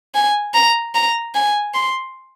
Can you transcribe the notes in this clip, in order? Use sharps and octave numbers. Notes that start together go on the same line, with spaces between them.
G#5
A#5
A#5
G#5
C6